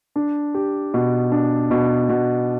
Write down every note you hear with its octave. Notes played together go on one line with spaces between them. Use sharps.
D4
G4
B2
D4
B2
B2